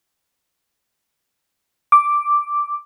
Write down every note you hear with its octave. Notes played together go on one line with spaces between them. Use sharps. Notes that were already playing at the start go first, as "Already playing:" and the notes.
D6